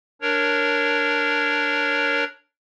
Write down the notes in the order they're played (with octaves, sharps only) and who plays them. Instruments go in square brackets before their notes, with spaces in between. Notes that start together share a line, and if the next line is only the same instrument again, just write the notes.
[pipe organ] D4 A#4 C#5